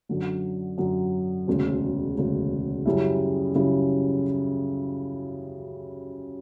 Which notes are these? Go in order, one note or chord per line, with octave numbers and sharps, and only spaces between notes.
F#2 D3 F#3
F#2 D3 F#3
E1 D2 C#3
E1 D2 C#3
F#2 C#3 G3 C#4 E4
F#2 C#3 G3 C#4 E4